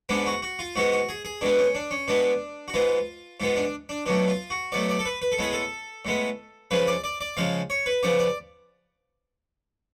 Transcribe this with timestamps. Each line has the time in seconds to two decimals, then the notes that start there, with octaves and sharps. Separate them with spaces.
0.09 G#2 G#3 B3 D4
0.26 F#4
0.42 F#4
0.59 F4
0.76 G#2 G#3 B3 F#4
0.92 F#4
1.09 G#4
1.25 G#4
1.41 B2 G#3 B3 D4
1.58 C#4
1.75 D4
1.91 C#4
2.08 B2 G#3 B3 D4
2.68 F#4
2.74 G#2 G#3 B3 F4
3.40 G#2 G#3 B3 F4
3.56 D4
3.89 D4
4.06 B2 F#3 A3 D4
4.28 F4
4.50 F#4
4.72 B2 F#3 A3 D5
4.89 D5
4.99 A4
5.05 B4
5.22 B4
5.32 A4
5.38 A2 G#3 B3 G#4
5.53 A4
6.05 A2 G#3 B3
6.71 C#3 F3 G#3 B4
6.87 D5
7.04 D5
7.21 D5
7.37 C#3 F3 G#3 F5
7.70 C#5
7.86 B4
8.03 C#3 F3 B3 D5
8.19 D5